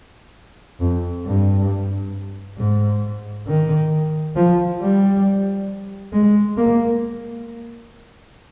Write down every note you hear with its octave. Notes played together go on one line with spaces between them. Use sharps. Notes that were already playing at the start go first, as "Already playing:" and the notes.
F2
G2
G#2
D#3
F3
G3
G#3
A#3